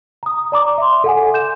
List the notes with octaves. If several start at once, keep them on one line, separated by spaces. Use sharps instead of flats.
A#5 D#6
D5 A#5 D6
E5 C6
A4 F#5 G#5
G6 E7